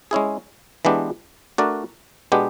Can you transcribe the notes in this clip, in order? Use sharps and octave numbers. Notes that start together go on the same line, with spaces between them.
G#3 C#4 E4 G#4
E3 G#3 B3 D4 G4
A3 D4 F#4 A#4 D5
B2 G#3 B3 D4 G4